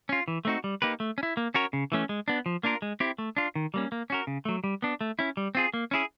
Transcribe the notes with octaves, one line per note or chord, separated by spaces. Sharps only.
C#4 F4
E3
A3 C4 D#4 F#4
G3
A#3 D#4 G4 B4
A3
C#4
E4
A#3
C#4 F#4 A#4 C#5
C#3
E3 A3 C#4
G#3
B3 D4
F3
A#3 D4 F4 A#4
G#3
C4 E4 G4
A3
D4 F4
D#3
G3 A#3 C#4
A#3
C#4 F#4 A#4
C#3
F#3 A3
G3
B3 D4
A3
C#4 E4
G3
C4 F4 G#4
A#3
C#4 E4 G#4